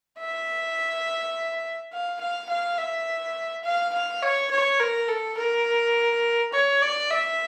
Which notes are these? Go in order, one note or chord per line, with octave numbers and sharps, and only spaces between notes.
E5
F5
F5
F5
E5
F5
F5
C#5
C#5
A#4
A4
A#4
C#5
D5
E5